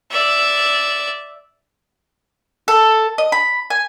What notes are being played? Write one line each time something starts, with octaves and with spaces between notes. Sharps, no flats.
D5 E5
A4
D#5
B5
G#5